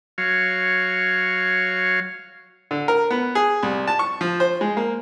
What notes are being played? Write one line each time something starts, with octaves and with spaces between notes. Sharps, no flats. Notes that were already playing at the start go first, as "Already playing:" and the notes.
F#3 C#5 F5
D3
A#4
B3
G#4
C2
A5
C#6
F3
C5
G#3
A#3